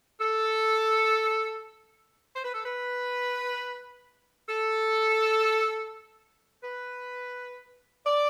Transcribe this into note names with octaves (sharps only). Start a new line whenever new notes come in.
A4
C5
B4
A4
B4
A4
B4
D5